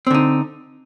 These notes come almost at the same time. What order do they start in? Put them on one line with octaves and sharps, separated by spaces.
C4 D3 D#4